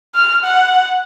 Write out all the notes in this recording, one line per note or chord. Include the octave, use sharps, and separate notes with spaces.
F6
F#5